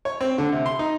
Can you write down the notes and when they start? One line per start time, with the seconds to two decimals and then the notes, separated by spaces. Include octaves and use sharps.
0.05 C#5
0.21 C4
0.38 D3
0.52 C3
0.66 C6
0.79 D#4